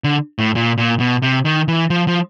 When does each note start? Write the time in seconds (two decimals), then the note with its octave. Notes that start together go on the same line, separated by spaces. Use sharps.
0.04 D3
0.39 A2
0.56 A#2
0.78 A#2
1.00 B2
1.22 C3
1.45 D#3
1.68 E3
1.90 F3
2.08 F3